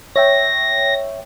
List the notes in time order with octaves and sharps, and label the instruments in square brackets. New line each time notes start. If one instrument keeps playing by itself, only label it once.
[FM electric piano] C#5 E5 G5 [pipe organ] A#6